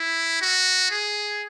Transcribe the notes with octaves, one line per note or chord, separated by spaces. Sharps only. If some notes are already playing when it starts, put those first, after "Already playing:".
Already playing: E4
F#4
G#4